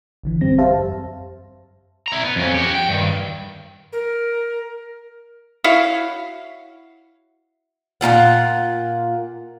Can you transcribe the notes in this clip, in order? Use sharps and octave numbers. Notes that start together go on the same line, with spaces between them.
A1 D3 E3
F#2 G3 C4 A#6
G4 C5 E5 F5 A5
F#2
E4 A#5
B3
F2 C#4
F#4 G4
G5
G2 D#3
A#4
E4 F#4 C#5 F5
A#2 D#4 F4 F#5